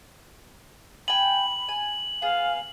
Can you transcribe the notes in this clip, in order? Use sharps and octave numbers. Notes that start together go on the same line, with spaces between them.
G5 G#5 B5 F#7
G#5
B3 G#4 F5